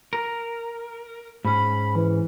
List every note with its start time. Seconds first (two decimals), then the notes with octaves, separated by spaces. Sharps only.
0.13 A#4
1.45 G#2 C#4 B5
1.95 E3